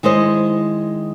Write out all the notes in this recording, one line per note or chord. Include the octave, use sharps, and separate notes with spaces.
D#3 G#3 E4 C5 D#5